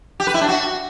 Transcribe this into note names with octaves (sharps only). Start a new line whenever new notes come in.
G4
B4
E4
D4
F#4